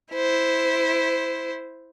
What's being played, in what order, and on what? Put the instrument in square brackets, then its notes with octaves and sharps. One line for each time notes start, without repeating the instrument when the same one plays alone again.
[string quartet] E4 C5